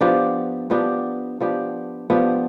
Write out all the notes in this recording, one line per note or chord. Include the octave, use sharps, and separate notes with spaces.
F3 B3 D4 G4
F3 B3 D4 G4
F3 B3 D4 G4
F3 B3 D4 G4